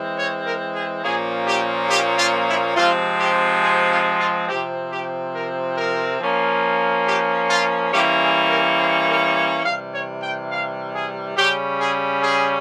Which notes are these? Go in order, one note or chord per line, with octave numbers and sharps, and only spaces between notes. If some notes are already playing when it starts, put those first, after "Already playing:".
Already playing: E3 G#3 C4
C#5
A#4
G#4
A#2 F3 A#3 C#4 G#4
G4
G4
F4
E4
C3 F3 G#3 C4 F4
G4
G#4
F4
F4
C3 F3 C4 G4
G4
A#4
A#4
F3 A#3 C#4
G4
F4
E3 G3 A#3 C#4 G4
G#4
A#4
C5
A#4
C#5
C3 E3 G3 F5
C#5
G5
F5
G#4
C#3 G3 C#4 G4
G#4
G#4